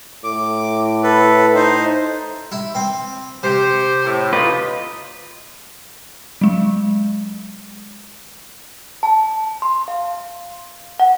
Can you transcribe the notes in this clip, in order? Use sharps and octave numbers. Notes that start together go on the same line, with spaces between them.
A2 D6
A4 B4
D#4 C5
E4
C4
C3 G4 C5
A2
B2 D#4 F4 G4 B4 D#5
F#3 G#3
A5
C6
F5
F#5